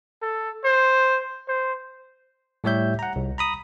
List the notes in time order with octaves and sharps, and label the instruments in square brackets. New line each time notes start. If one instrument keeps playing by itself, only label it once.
[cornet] A4
C5
C5
[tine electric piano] A2 G3 G4 C#5 E5 G6
F#5 A#5
C2
A#5 B5 D#6